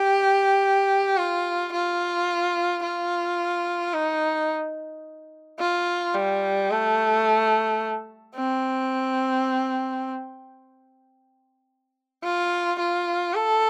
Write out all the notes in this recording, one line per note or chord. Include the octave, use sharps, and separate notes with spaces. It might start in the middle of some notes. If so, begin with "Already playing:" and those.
Already playing: G4
F4
F4
F4
D#4
F4
G3
A3
C4
F4
F4
A4